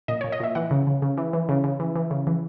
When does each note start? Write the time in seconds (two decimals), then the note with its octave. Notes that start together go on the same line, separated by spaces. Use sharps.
0.08 A#2 D#5
0.21 A#2 C#5
0.32 D#5
0.40 A#2 E5
0.55 E3 F#5
0.71 C#3
0.87 C#3
1.02 C#3
1.17 E3
1.33 E3
1.49 C#3
1.64 C#3
1.80 E3
1.96 E3
2.11 C#3
2.27 E3